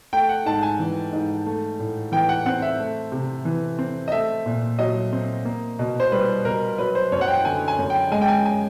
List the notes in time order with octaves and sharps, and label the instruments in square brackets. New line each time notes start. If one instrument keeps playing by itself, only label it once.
[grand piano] A3 G5
F#5
G#2 A5
G#5
E3
G#2
A3
A2
E3 G5
F#5
C4 F#5
E5
A3
C3
E3
C4
D#5
A3 E5
A#2
F#3 D#5
C4
A#3
B2
C5
G3 B4
B2 A#4
F#3 B4
C5
F#2 C#5
F#5
G5
D3 G#5
G#5
F#2
G5
G#3 G#5
G5
G#5
G#5